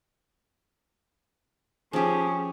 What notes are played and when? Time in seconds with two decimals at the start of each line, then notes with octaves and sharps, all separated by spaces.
1.93 F3 C#4 G4 G#4